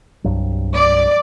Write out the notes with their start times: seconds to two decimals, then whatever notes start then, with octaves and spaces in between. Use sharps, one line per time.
0.24 C2 G2 F#3
0.75 D5